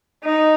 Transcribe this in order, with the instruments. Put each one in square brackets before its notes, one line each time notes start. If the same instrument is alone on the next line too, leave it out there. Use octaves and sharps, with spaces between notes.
[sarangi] D#4